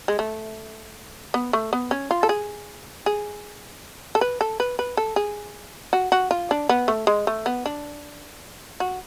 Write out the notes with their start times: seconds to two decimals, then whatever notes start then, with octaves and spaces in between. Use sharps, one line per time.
0.08 G#3
0.19 A3
1.34 B3
1.53 A3
1.73 B3
1.91 C#4
2.11 F4
2.23 A4
2.29 G#4
3.06 G#4
4.15 A4
4.21 B4
4.41 A4
4.60 B4
4.79 B4
4.97 A4
5.16 G#4
5.93 F#4
6.12 F#4
6.31 F4
6.51 D4
6.69 B3
6.88 A3
7.07 G#3
7.27 A3
7.46 B3
7.66 D4
8.80 F#4